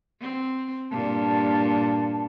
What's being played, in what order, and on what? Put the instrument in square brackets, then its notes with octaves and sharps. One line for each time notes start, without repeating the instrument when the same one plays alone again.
[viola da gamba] C4
[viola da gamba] G2 A#2 [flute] A5